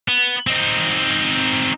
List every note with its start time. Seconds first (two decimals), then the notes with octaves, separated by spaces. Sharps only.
0.08 B3
0.47 C4 D#4